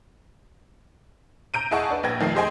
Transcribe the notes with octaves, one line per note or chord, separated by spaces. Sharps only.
A#5 G6 D7 D#7
E4 G#4 D#5 F#5 A5 C#6
D4 B4
A#1 B4 G5 G#6 A#6
F2 D#3 F3 A3 C7
G4 G#4 C5 D#5 G5 G#5